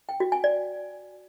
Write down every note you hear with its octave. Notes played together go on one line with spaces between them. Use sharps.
G5
F#4
G#5
D5